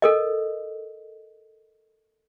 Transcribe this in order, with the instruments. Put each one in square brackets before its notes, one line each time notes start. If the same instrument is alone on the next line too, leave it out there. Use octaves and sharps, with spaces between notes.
[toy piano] A4 A#4 D#5